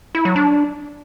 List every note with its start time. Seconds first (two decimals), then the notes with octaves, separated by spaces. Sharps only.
0.15 E4
0.25 F#3
0.36 D4